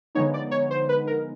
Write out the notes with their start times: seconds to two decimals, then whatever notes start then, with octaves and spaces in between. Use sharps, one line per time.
0.15 D3 F3 G#3 B3 D#4 C#5
0.34 D5
0.51 C#5
0.71 C5
0.89 B4
1.07 A#4